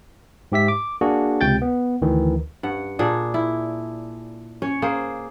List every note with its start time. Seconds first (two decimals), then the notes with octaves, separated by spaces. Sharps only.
0.52 G#2 G4 E5 B6
0.68 D6
1.01 A#3 D4 F#4 G#4
1.41 C#2 C3 G5 G6 A6
1.62 B3
2.02 D2 D#3 E3
2.63 G2 F#5
2.99 A#2 D4 G#4
3.34 E4
4.62 C#4 C#5
4.82 A#3 G#4 C5